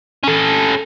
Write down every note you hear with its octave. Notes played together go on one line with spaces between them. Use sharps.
C#4 A4